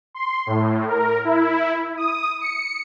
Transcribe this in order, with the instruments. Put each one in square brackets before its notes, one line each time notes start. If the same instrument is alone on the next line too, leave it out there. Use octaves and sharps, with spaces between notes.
[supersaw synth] C6
A2
A#4
E4
D#6
C#7